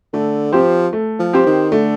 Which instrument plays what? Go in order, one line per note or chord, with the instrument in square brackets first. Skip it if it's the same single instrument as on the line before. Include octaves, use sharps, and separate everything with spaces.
[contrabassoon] D3 [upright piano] A3
[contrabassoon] F3 [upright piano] C4 G4 C5
[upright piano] A3
[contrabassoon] F3
[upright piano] C4 G4 C5
[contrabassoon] D#3
[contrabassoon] D3 [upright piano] A3